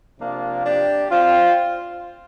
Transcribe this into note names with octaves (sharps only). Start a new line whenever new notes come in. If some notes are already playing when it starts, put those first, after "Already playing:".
C3 F3 A#3 D4
D4 G4
C4 F4